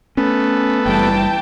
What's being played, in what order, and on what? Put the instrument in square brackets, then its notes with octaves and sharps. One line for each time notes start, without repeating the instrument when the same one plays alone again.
[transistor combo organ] A3 B3 [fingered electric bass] C#4
[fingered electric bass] F#1 G3 [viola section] E3 G5 A5